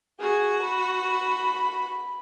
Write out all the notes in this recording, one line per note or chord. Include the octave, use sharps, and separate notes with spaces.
F#4 G#4
B5